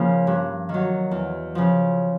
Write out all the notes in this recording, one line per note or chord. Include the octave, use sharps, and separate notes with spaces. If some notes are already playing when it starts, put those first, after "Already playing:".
Already playing: C#3 F3 A#3
G2
D#3
F#3
E2
C#3 F3